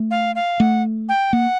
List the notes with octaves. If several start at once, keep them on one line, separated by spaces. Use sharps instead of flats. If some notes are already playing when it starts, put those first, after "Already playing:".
Already playing: A3
F5
F5
A3 F#5
G5
A#3 F#5